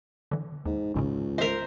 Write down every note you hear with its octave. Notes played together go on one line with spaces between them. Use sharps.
D3 E3
D#2 G#2
G#1 C#2 G#2 C#3
A#4 C5 D#5 E5